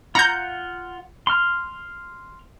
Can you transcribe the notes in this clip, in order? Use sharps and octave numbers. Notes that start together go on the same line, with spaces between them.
F4 F#5 A#5 G6
C6 F6